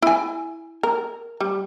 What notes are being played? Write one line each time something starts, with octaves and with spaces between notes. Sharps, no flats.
E4 G#5
A#4
G3